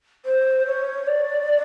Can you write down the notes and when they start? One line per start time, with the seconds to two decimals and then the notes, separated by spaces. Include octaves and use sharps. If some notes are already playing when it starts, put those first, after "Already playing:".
0.25 C5
0.67 C#5
1.06 D5